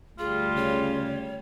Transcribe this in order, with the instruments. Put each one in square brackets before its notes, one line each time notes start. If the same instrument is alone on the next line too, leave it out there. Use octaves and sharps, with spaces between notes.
[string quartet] D2 G3 [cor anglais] F4 [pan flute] G#4
[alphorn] C#3 [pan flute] C#5